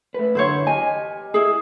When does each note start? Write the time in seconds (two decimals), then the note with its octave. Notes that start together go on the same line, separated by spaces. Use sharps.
0.14 A3 B4
0.35 F#2 D3 E4 C5 C#5
0.67 G4 D#5 G#5
1.34 E4 G#4